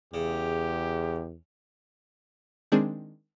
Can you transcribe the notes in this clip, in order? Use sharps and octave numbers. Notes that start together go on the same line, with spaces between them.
E2 C#3 G4
D#3 G#3 C4 D4 G#4